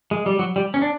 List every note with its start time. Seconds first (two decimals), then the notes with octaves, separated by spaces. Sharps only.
0.11 G#3
0.26 G3
0.39 F#3
0.56 G3
0.74 C#4
0.82 D4